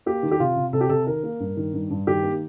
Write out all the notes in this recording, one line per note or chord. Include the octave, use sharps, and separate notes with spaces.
A#3 G4
D#3
G4
C3 F4
C3
C3 A4
G4
C3 A4
D#3 A#4
A#3
G2
D#3
G2
G2
D#3 G4
A#3